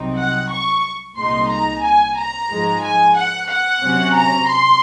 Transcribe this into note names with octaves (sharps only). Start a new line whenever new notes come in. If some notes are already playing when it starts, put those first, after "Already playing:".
Already playing: C2 C3 F#3 C4 D#4
F#5
C#6
C2 A#2 G#3 D#4 C6
A#5
G#5
A#5
G#2 F3 G#3
G#5
F#5
F#5
C3 F#3 C#4
A#5
C6